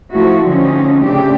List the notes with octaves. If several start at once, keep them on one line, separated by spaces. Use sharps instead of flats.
F3 A3 E4 F#4
D3 F3 C4 C#4 D#4
C#3 A3 C4 D4 G4